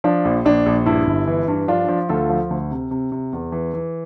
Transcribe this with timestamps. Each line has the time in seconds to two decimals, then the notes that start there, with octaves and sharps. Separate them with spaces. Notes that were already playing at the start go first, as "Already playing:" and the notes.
0.04 F3 D4
0.25 A#1
0.45 A#1 D4
0.66 A#1
0.86 G2 E4
1.07 G1
1.28 E3
1.48 G2
1.68 F3 D4 F4
1.88 F3
2.09 D2 F4 A4
2.30 F3
2.50 D2
2.71 C3
2.91 C3
3.12 C3
3.33 E2
3.52 E3
3.74 E3